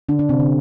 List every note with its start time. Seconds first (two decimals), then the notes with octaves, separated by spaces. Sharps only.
0.09 D3 D4
0.19 D3 D4
0.29 C3 C4
0.40 D3